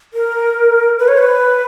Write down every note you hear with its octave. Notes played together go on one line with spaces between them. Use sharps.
A#4
B4
C#5
B4